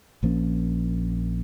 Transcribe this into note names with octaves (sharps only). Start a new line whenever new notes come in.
A#1 F3 A#3 C#4